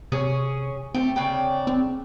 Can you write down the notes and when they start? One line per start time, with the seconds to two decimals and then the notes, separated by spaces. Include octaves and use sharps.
0.12 C3 C#4 G#4
0.94 A3 C4 G4
1.16 C#3 D4 G5
1.67 C4